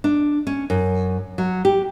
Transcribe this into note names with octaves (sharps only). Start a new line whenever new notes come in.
D4
C#4
F#2
F#3
G4